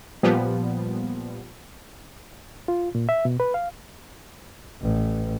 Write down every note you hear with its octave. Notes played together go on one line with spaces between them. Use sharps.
A#2 F3 G3 B3
F4
A#2
E5
B2
B4
F5
A1